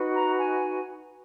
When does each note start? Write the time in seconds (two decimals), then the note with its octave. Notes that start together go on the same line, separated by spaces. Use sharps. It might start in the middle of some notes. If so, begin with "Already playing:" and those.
Already playing: D#4 F#4 B4
0.14 A#5
0.38 G#5